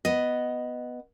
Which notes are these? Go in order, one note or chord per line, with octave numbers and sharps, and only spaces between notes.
B3 D#5